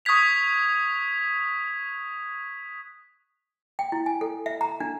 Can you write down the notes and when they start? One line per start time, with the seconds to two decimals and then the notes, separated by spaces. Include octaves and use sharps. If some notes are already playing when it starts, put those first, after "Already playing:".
0.05 C#6 D#6 F#6 G#6 B6 F7
3.79 G5
3.92 E4
4.06 G#5
4.21 A4
4.46 E5
4.61 A#5
4.80 D4